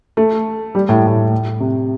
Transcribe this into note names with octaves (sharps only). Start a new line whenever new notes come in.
A3
G3
A2
A2
C3